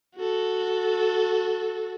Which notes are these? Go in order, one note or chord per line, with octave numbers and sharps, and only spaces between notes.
F#4 A4